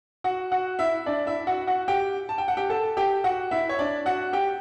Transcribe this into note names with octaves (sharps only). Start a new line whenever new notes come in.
F#4 F#5
F#4 F#5
E4 E5
D4 D5
E4 E5
F#4 F#5
F#4 F#5
G4 G5
A5
G5
F#5
G4 G5
A4 A5
G4 G5
F#4 F#5
E4 E5
C#5
D4 D5
F#4 F#5
G4 G5